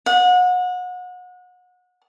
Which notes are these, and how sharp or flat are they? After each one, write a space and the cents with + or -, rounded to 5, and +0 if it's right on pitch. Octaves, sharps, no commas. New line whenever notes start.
F#5 -30